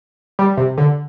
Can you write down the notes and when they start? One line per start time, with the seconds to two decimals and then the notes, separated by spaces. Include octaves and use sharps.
0.39 G3
0.57 C3
0.78 D3